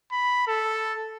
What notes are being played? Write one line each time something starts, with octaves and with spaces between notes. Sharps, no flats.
B5
A4